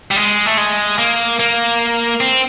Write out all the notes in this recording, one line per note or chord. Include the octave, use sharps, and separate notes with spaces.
G3
G#3
A3
G#3
A#3
A#3
C4